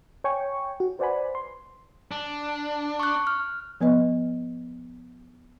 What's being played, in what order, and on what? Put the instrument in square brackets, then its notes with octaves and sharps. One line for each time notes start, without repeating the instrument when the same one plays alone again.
[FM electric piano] C#5 G5 G#5 C#6
F#4
B4 C5 D5 F#5 G#5 B5
C6
[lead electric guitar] D4
[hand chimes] C#6 F#6
F6
[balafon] F3 B3 B4 D#5